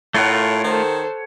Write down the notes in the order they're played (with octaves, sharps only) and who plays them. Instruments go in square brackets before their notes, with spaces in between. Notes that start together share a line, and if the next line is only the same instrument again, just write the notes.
[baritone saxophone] A2 [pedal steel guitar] A3 F4 A#4 [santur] C#5 F#5
[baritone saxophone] D#3 [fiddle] A4 C5